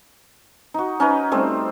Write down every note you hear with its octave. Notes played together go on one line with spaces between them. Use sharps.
D#4 F#4
C#4 D#4 B4
G3 A3 C4